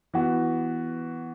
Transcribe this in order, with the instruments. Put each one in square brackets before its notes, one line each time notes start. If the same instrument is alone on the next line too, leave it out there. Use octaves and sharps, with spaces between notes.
[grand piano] E3 B3 F#4